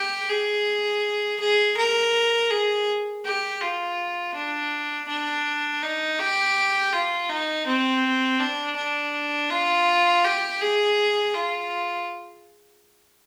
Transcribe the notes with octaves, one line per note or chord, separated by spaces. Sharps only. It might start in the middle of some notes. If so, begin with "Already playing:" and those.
Already playing: G4
G#4
G#4
A#4
G#4
G4
F4
D4
D4
D#4
G4
F4
D#4
C4
D4
D4
F4
G4
G#4
F4